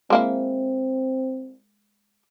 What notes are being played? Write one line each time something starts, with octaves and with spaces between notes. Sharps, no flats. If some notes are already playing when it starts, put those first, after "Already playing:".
G#3 A#3 C4 E4